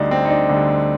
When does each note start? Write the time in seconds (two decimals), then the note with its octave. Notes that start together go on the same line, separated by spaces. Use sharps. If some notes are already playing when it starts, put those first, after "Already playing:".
Already playing: D2 D3 G3 D4 D#4
0.11 C4
0.25 D#4
0.30 D4
0.49 D2 D3 G3